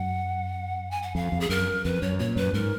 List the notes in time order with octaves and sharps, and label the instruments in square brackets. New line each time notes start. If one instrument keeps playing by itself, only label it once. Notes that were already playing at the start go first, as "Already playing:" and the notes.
Already playing: [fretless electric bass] F#2 [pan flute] F#5
[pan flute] G#5
F#5
[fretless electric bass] F2 [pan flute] F5
[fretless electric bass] F2
[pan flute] G#4
[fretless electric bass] F#2 [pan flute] A#4
[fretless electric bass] F2 [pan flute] B4
[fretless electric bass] F#2 [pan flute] C#5
[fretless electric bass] A#2 [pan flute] C#5
[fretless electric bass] F#2 [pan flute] B4
[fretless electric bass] G#2 [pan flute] A#4